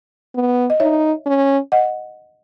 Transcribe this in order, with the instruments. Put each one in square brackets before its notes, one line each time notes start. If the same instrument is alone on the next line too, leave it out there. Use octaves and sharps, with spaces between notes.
[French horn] B3
[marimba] D#5
[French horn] D#4 [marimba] C#5 E5
[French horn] C#4
[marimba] D#5 F#5